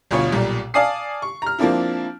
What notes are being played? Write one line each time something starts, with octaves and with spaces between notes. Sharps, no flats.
G1 D2 B2 F4 C#5
B1 A#2 G3
D5 F5 G#5 A5 D#6 C7
C#6
A#5 F6
F3 A#3 C4 D4 E4